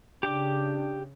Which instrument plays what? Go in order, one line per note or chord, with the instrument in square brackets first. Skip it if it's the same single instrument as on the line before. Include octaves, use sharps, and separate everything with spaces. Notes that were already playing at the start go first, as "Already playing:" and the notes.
[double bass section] C#3 [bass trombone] D4 [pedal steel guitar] G4 G5 D6